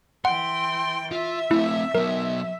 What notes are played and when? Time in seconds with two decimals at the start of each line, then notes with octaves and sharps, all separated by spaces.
0.25 E3 F#5 G5 C6
1.11 F4 E5
1.51 A3 C4 E4
1.95 F#3 B3 A#4